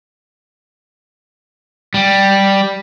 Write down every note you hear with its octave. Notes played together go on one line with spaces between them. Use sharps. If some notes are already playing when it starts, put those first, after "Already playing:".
G3